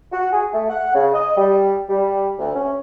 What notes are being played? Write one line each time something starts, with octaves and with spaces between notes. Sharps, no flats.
F#4
G#4
A3
F#5
C#3
D#5
G3
G3
D2
C#4